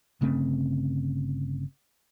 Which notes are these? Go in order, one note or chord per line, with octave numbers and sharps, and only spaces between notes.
G1 C#3 A3 C4